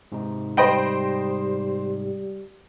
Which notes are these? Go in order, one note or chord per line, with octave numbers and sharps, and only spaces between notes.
G#2 C3 D#4
G3 C5 D#5 G5 B5 D7